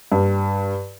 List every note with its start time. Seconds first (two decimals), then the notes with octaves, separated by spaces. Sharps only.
0.12 G2